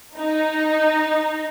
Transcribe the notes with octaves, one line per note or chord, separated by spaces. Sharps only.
D#4